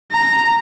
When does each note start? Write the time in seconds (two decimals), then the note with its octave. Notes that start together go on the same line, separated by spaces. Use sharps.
0.12 A#5